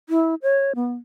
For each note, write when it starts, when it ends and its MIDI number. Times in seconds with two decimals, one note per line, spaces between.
0.09 0.35 64
0.42 0.73 73
0.75 0.93 59